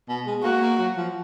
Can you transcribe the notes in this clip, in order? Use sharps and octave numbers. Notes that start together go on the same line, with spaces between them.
B2
G#3
A#3 F#4
A#3
F#3
F3